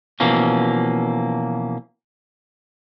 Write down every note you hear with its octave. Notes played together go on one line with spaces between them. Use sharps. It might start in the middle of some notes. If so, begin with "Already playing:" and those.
B2 E3 F3 A#3 C#4